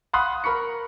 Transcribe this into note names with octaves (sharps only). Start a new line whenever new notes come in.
F5 F#5 B5 C6 D#6 F#6
A#4 B5 C#6 C#7